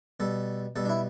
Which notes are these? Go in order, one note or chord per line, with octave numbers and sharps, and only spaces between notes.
B2 G3 A4
B2 G3 A4
D4
E4